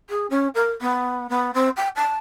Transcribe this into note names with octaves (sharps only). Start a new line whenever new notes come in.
G#4
C#4
A#4
B3
B3
C4
G5
A5